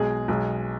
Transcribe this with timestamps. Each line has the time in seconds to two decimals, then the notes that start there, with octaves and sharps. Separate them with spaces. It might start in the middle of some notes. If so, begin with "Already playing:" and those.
Already playing: B1 B2 G#3 G#4
0.28 B1 B2 G#3